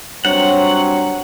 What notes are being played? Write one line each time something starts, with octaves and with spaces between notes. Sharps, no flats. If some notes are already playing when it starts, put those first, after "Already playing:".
G2 F#3 C4 C#5 F#5